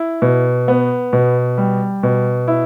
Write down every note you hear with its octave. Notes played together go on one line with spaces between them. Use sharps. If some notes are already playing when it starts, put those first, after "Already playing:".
Already playing: E4
B2
B3
B2
G3
B2
E4